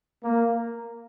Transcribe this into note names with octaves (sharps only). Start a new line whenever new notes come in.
A#3